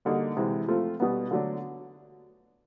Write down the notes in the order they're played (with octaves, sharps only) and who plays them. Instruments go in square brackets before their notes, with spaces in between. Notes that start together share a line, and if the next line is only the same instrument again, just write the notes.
[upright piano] D3 G3 A#3 D#4 F#4
C3 E3 G#3
F3 A3 C4 F4
B2 G3 B3
D3 F#3 A3 D4